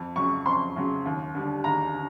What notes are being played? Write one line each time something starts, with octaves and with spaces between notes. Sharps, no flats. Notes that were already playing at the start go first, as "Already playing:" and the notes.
Already playing: F2
C#3 F#3 C#6
F2 C6
C#3 F#3
D#2
D3 G3
D#2 A#5
D3